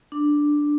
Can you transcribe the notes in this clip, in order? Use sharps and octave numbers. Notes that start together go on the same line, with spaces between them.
D4